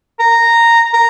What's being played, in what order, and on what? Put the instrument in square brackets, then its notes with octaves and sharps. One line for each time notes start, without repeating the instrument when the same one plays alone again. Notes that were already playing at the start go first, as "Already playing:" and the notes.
[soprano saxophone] A#5
A#5